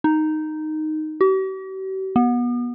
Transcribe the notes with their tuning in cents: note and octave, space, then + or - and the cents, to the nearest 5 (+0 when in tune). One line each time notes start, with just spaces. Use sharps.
D#4 -5
G4 -45
B3 -30